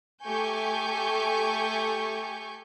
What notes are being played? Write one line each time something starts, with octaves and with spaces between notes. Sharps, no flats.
A3 G4 G#5 C#6 G6